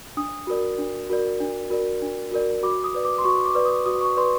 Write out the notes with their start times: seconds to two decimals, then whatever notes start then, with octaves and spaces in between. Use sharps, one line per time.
0.17 D4 D#6
0.47 F#4 A#4 D5
0.78 D4
1.09 F#4 A#4 D5
1.40 D4
1.70 F#4 A#4 D5
2.02 D4
2.32 F#4 A#4 D5
2.63 F#4 D6
2.84 D#6
2.94 B4 D5
3.05 D6
3.18 C6
3.24 F#4 C#6
3.45 D6
3.55 B4 D5
3.65 D#6
3.86 F#4 D#6
4.01 C#6
4.17 B4 D5 C6